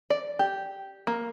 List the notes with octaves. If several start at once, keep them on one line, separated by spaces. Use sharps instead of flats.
D5
G4
A#3